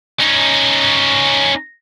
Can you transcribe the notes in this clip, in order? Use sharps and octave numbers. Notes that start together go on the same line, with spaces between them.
C#4 D#4